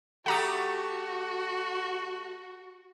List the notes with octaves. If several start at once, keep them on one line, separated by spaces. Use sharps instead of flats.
A3 F#4 G4 F#5 A#5 D#6